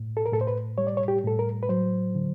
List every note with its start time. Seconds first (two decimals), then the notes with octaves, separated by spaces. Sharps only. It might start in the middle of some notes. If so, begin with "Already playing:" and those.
Already playing: A2
0.17 A4
0.26 A#4
0.32 A2 A4
0.41 C5
0.47 B4
0.78 G3 C#5
0.87 D5
0.97 C#5
1.08 G4
1.24 A2 A4
1.39 A#4
1.63 B4
1.69 F#3 C5
2.15 D3